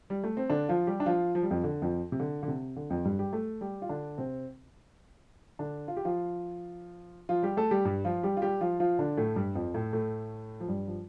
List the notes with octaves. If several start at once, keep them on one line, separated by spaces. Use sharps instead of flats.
G3
A3
C4
D3 D4
F3 F4
G3 G4
D4
F3 F4
F3
G3
F2 F3
D3
F2 F3
C3
D3
D3
C3
D3
F2 F3
G2 G3
G3 G4
A3 A4
G3 G4
F4
D3 D4
C3 C4
D3 D4
F4
G4
F3 F4
F3 F4
G3 G4
A3 A4
G3 G4
G2 G3
F3 F4
G3 G4
F4
G3 G4
F3 F4
F3 F4
D3 D4
A2 A3
G2 G3
F2 F3
A2 A3
A2 A3
F3
G2 G3
F3